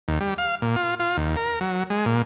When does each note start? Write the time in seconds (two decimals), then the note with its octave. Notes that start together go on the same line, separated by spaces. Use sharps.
0.08 D#2
0.20 G3
0.38 F5
0.62 A#2
0.76 F4
1.00 F4
1.17 D#2
1.36 A#4
1.61 F#3
1.90 G#3
2.06 A#2